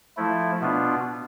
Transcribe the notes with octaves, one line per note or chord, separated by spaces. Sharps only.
F3 A3 E4
B2 B3 D4 F4